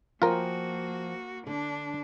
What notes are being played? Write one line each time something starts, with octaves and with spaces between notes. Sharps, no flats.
F3 A#3 F4 F#4 A#4 G5 G#5
D3 D4